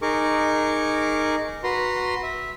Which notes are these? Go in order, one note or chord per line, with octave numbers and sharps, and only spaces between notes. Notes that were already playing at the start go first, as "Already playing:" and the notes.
D#4 G#4 A#4 C#6 D6
F#4 B4 A#5 C6
E5